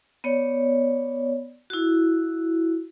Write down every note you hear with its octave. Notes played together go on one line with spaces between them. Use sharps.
B3 C#5 D5
E4 F#4